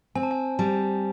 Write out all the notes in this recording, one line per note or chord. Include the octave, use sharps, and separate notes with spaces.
C4 G#5
A5
G#5
G3 A5